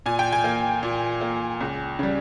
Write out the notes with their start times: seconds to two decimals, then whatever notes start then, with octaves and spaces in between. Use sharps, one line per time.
0.06 A#2 G#5
0.19 G5
0.32 G#5
0.44 A#3
0.83 A#2
1.21 A#3
1.61 C#2
1.99 C#3 G3